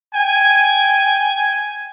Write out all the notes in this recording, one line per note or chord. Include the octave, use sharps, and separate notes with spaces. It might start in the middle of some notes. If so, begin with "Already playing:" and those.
G5 G#5